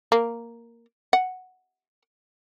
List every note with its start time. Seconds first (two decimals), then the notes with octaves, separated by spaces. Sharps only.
0.12 A#3
1.13 F#5